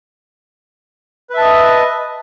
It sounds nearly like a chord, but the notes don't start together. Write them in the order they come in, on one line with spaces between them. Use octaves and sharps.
B4 E5 A5 D#5